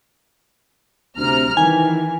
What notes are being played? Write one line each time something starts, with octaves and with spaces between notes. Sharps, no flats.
D2 C3 A#5 F6
D#3 E3 G#5